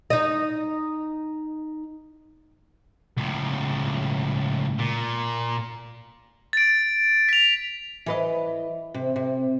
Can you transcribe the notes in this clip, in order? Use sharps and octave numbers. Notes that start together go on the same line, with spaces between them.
D#4 D#5
C#2 A2
A#2
A6 D7
B6 F7
E3 B4 D#5
C3
C3